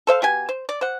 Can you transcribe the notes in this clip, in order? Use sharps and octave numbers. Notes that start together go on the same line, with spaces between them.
A4 C5 E5 F5
B2 G4 G#5
C5
D5
C5 F#5